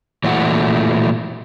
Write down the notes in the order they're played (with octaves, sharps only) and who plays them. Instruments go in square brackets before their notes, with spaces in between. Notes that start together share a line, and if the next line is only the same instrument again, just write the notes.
[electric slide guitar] A#2 E3 F#3 A3 E4 F#5